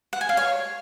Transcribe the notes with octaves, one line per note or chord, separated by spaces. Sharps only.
F#5
G#5
F5
C#5